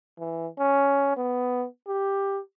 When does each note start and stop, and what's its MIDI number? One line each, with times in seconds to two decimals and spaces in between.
0.19 0.47 52
0.58 1.12 61
1.17 1.66 59
1.87 2.39 67